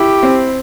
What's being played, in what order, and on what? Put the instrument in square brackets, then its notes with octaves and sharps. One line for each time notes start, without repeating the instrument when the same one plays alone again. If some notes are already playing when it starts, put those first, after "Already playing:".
Already playing: [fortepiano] E4 [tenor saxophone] G4
[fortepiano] C4